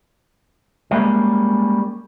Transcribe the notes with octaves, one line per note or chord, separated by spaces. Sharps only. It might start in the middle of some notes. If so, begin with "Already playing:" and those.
G3 G#3 A#3 C#4